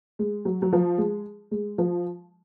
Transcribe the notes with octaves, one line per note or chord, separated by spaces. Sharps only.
G#3
F#3
F#3
F3
G#3
G#3
F3